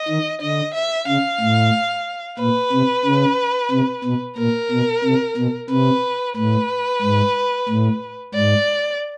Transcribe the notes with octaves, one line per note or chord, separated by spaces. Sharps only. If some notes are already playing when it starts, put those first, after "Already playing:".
Already playing: D#5
D#3
D3 D#5
E5
C#3 F5
A2
A#2 B4
C3
C#3
C3
B2
A#2 A#4
B2
C3
B2
C3 B4
A2 B4
G#2
A2
G#2 D5